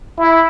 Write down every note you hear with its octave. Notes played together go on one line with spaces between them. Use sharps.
E4